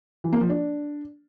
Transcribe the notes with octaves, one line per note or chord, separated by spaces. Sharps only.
E3
A#3
F3
D4